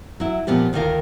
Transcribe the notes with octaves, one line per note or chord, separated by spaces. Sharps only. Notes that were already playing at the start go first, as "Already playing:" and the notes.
F#3 E4
A#2 F3 B3 C4 G4
D2 D#3 F4 A4 A#4 F5